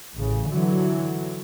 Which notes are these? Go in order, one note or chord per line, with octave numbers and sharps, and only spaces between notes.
A1 C#3
D3 E3 F#3